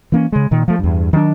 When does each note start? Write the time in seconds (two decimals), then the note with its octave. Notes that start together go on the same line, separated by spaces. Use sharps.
0.12 E3 A#3 C#4
0.32 C#3 G#3
0.51 A#2 D#3
0.68 F3 A3
0.79 E2 G2
1.13 D#3 F#3 G3 D4